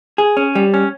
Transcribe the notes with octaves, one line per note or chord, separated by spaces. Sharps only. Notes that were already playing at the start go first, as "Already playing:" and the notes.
G#4
C#4
G3
C#4